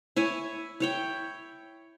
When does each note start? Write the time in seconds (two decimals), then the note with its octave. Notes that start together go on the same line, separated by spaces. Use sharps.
0.16 E4 C#5 G#5
0.80 E4 C#5 G5